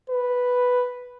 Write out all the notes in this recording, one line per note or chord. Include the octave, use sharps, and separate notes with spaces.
B4